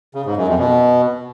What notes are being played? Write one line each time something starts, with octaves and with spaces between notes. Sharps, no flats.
C#3
G#2
F#2
F2
B2